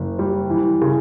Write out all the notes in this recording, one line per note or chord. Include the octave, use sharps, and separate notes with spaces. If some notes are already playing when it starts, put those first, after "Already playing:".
Already playing: F#1
G3
E3
C#3